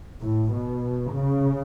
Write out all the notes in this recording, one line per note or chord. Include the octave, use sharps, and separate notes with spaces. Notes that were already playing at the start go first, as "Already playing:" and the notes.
A2
B2
C#3